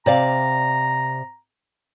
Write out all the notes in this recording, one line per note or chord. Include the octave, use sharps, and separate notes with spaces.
C3 D5 F5 A#5